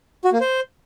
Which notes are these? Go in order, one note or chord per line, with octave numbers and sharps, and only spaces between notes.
F#4
A#3
C5